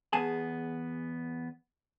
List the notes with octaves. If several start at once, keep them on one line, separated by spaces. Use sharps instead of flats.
E2 B3 G#4 G#5 A5